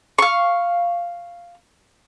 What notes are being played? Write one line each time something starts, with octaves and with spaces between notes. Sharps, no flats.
F5 C#6